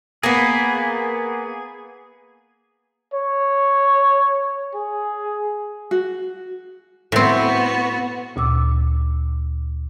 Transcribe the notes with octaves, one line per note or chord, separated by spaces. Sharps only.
A#3 B3 G#4
C#5
G#4
F#4
A2 B3 C4 F#4
D2 A#2 D6 E6